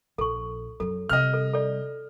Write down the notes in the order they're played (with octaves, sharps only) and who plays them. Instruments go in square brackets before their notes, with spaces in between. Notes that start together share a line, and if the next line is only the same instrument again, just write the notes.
[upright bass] A#1 [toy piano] A4 C#6
[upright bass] F#2 F#3 [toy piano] A4
[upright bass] C3 G3 [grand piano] D#5 F6
[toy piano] A4
A4 D5